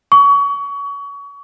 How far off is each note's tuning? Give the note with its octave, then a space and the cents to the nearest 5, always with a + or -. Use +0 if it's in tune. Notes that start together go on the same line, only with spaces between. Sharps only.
C#6 +30